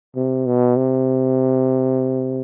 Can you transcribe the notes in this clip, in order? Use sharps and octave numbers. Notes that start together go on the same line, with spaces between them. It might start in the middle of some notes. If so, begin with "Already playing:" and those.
C3
B2
C3